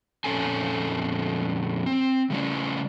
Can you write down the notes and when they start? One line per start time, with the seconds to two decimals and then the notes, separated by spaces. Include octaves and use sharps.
0.24 F2 A#2 C#4 A4 G#5
1.86 C4
2.30 C#3 G3 C#4